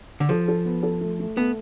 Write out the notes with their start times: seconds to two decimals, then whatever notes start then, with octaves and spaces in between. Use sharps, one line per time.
0.20 D3
0.29 F3 A4
0.48 A4
0.65 B3
0.83 A4
1.01 A3
1.20 A3
1.36 A3 B3